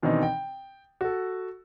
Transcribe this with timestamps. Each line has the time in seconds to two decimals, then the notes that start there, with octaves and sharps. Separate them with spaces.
0.03 B2 D#3 E3 C4 D4 D#4
0.23 G5
1.01 F#4 A4